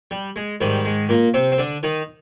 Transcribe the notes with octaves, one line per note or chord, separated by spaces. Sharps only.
G3
G#3
G#2 D#3 G3
G#3
A#2 A#3
C3 C4
C4
D3 D4
D#3 D#4